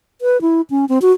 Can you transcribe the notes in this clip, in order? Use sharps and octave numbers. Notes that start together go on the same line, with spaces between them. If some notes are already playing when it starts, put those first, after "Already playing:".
B4
E4
C#4
C4
F#4